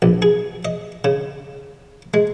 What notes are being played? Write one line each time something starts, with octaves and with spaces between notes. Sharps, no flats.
A#1
G#4
D#5
C#3
G#3